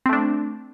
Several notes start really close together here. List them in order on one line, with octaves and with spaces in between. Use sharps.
C4 A3 D4